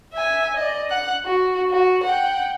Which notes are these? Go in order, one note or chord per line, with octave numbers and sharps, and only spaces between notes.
E5 G#5
D5 D#5
F#5 F#6
F#4
F#4
F#5 G5